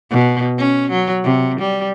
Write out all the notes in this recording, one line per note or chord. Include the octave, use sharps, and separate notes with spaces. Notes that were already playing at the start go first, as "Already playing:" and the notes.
B2
C#4
F#3
C3
G3